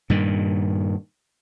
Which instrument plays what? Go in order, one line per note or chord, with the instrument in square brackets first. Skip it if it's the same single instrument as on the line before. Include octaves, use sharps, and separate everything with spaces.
[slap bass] G2 A#2 D#3